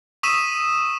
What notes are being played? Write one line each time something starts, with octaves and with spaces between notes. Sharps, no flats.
C#6 D#6 E6 B6 D#7 E7